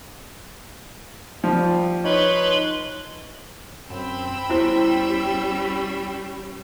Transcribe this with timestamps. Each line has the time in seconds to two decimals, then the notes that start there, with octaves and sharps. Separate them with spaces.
1.44 F3 G3
2.05 D#4 B4 C#5 B5 C6
3.90 F#2 C4 G5 B5 E6
4.50 E2 G3 C#4 E4 F#4 C5